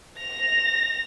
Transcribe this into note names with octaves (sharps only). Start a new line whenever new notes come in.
A#6 F7